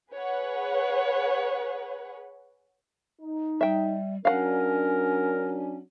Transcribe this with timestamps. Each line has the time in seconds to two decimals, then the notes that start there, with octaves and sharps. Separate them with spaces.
0.12 G#4 B4 C#5 F#5
3.21 D#4
3.61 G3 E5 G5
4.25 F#3 C#4 D4 A#4 F5 F#5